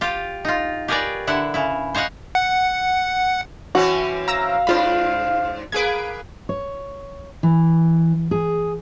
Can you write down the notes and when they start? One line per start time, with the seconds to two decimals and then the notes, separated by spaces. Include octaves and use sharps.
0.01 F4 G4
0.45 D#4 F4
0.88 G4 G#4 A#4 B4 C#5 D5
1.27 D3 E4 F#5
1.54 C#3 E4
1.95 C5 C#5 D#5 F5 F#5
2.35 F#5
3.75 E3 C4 C#4 F#4
4.28 F5 A#5 E6 A#6
4.67 G#2 D4 F4 C5 B5
5.72 A#3 G#4 B4 G#6 D7
6.49 C#5
7.43 E3
8.31 G#4